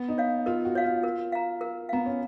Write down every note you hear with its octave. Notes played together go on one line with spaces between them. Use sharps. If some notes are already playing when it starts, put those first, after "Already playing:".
Already playing: B3
D#4
C#5 F5
F4 A#4
F#4
C#5 F5
F4
A#4
F5 A#5
A#4
B3 F5 A#5
C#4